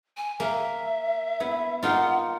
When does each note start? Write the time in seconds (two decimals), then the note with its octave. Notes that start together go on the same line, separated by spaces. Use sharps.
0.17 G#5
0.40 A#3 E5
1.40 B3 E4
1.83 A#3 D#4 F4 F#5